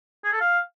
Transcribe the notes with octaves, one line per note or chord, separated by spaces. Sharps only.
G#4
A4
F5